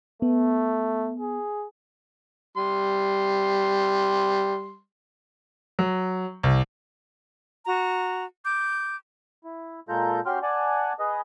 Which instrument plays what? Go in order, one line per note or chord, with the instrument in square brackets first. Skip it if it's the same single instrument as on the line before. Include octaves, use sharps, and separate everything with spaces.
[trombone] A3 [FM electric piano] B3
[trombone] G#4
[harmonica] G3 C6
[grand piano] F#3
C2
[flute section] F#4 A#5
D6 G6
[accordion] E4
A#2 G#3 F4 A4 A#5 G6
C#4 F#4 G4 G5 C6 F6
D5 F#5 G#5 A5
G#4 B4 D#5